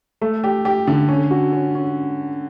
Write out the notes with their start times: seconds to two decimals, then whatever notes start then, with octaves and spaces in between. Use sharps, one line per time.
0.22 A3
0.44 G4
0.65 G4
0.87 D3
1.09 C#4
1.31 F#4
1.53 C#4
1.75 C#4